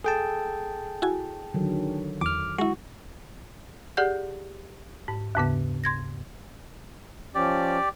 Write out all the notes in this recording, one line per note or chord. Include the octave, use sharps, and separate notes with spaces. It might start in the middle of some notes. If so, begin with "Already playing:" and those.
G#4 A4 G5 A5
E4 F#4 G#5
D3 D#3 F#3
E2 D6 F6
G#3 E4 F#4
G4 G#4 D5 F#5 G6
G#2
D#2 G#2 C#3 B3
C6 G#6 A#6
F3 C#4 G4 D5